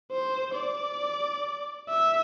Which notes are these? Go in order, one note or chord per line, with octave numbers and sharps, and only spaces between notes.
C5
D5
E5